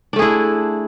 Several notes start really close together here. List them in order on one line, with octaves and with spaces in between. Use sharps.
D4 A3 G#4 E4